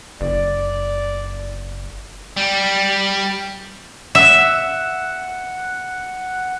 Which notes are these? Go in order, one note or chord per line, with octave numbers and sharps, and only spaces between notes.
F#1 D5
G3
E5 F#5